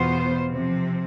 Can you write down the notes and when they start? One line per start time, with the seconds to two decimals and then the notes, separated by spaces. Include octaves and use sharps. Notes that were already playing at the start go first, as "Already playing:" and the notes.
Already playing: E2 B2 B3 F4 C5
0.49 C3 F3 C4